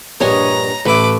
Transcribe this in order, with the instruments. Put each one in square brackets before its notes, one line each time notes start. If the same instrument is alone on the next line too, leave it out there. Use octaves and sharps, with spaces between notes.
[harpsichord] A#1 G2 [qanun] C#5 D#5 G#5 [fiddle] A#5
[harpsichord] A1 E5 [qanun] A3 [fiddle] B4 D6